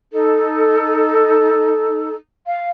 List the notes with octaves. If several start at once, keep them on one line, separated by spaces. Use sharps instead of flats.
D#4 A4
F5